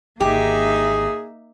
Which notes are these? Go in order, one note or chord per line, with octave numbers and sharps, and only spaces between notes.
G#1 D3 A#3 D#4 G4 G#4 E5